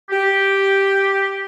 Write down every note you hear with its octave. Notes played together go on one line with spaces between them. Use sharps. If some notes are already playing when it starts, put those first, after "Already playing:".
G4